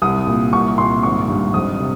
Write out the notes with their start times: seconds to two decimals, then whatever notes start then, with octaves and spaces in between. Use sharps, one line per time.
0.02 C2 D#6
0.27 A#2
0.53 C2 C#6
0.78 A#2 C6
1.03 G#1 C#6
1.28 G2
1.54 F2 D#6
1.80 C3